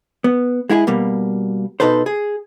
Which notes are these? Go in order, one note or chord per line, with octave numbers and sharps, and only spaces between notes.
B3
G#3 E4 F#4 G#4
B2 G3 A#3
B2 D#4 A4 B4 C5
G#4